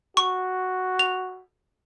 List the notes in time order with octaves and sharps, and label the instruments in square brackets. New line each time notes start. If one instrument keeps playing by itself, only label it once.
[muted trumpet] F#4 [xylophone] C#6
[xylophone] F7